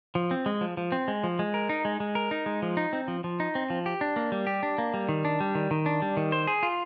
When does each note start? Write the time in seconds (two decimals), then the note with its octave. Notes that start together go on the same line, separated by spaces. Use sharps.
0.15 F3
0.31 C4
0.46 G#3
0.61 F3
0.77 F3
0.92 C4
1.08 G#3
1.24 F3
1.39 G#3
1.54 A#4
1.69 D#4
1.85 G#3
2.00 G#3
2.15 A#4
2.31 D#4
2.46 G#3
2.62 F3
2.77 D#4
2.93 C4
3.08 F3
3.24 F3
3.40 D#4
3.55 C4
3.70 F3
3.86 G4
4.01 D4
4.16 A#3
4.32 G3
4.47 G4
4.63 D4
4.78 A#3
4.94 G3
5.09 D#3
5.25 D4
5.40 G3
5.55 D#3
5.71 D#3
5.86 D4
6.02 G3
6.17 D#3
6.32 C5
6.47 G#4
6.63 F4